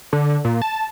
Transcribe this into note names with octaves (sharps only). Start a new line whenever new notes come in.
D3
A#2
A5